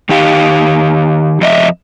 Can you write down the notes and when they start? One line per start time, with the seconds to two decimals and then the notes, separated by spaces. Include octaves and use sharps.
0.09 D#3 D#4 G4 F5
1.41 F2 D#5 E5